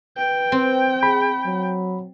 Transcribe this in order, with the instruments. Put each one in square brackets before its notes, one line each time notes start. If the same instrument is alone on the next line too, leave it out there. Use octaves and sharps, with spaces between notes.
[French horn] B4 [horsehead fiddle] G5
[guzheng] C4
[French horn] G#4 [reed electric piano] B5
[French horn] F#3